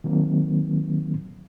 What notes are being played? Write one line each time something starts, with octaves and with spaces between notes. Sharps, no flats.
D#3 F#3 A#3 C4